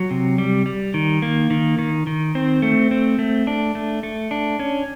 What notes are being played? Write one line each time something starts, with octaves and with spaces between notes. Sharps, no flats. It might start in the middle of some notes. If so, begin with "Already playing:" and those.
Already playing: F#3
C3
G3
G3
D#3
A#3
D#3
D#3
D#3
C4
A3
C4
A3
D4
A3
A3
D4
C#4